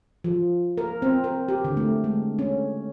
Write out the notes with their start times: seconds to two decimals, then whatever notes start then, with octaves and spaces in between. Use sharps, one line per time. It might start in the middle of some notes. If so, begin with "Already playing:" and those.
0.24 F3
0.78 A#4
1.02 C4
1.24 A#4
1.48 G4
1.65 D3
1.77 A3
2.04 G#3
2.39 C#4